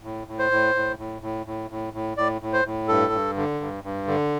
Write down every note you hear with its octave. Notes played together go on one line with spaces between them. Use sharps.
A2
A2
C5
A2
A2
A2
A2
A2
A2
A2
A2 D5
A2
C5
A2
G2 A4
G2
D3
G2
G2
D3